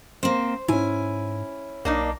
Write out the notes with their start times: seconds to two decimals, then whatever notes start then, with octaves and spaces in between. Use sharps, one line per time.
0.23 A#3 C4 C5
0.68 G#2 C#4 E4 G#5
1.85 B1 A#3 D4 D#4